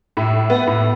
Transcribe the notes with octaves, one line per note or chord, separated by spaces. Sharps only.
A2
B3
A2